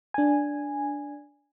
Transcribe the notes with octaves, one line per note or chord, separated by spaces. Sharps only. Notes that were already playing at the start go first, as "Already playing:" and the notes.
D4 G#5